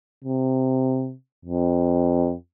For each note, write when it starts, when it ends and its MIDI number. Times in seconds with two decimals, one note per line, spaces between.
0.25 1.14 48
1.45 2.34 41